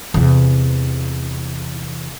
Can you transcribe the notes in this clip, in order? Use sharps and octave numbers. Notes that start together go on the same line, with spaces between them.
E2 C3